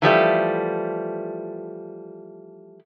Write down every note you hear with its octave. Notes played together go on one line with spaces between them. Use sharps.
E3 F3 G3 A3